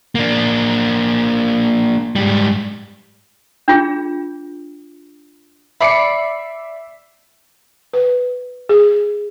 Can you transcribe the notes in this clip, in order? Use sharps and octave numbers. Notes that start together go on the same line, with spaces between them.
A#3 D4
G#2 G3
D4 F4 G#4
D5 E5 B5 C7 C#7
B4
G#4